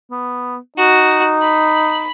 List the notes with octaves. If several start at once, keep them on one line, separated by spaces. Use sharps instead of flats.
B3
D#4 F#4
B5